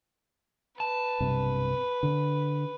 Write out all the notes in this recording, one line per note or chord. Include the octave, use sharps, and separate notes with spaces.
B4 A5
B1 G2 C3
D3